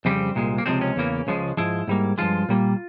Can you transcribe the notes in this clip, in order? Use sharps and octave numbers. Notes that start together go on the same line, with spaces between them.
F2 C#3 G3 C4
C2 A#2 G#3
A#3
C#2 C3 F3 G#3 C4
C#4
E2 C#3 E3 A#3
C#2 C#3 F3 G#3
G#2 F3 G#3 E4
G#2 G3 A#3
G2 F3 G#3 F4
A#2 G3 A#3